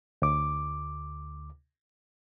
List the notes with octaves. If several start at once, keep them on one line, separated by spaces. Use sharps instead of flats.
D2 D6